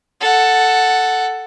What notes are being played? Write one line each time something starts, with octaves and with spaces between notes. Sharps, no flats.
A4 F#5